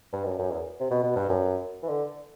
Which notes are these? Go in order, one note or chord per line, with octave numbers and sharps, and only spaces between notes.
G2
F#2
F#2
E2
C3
B2
B2
G2
F#2
E3
D3